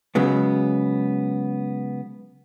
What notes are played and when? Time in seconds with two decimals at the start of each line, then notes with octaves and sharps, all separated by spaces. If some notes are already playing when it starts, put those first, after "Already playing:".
0.15 C#3 F#3 G#3 B3